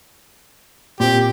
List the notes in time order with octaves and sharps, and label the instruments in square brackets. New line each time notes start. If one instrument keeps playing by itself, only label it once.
[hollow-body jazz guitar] A#2 C4 [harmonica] G4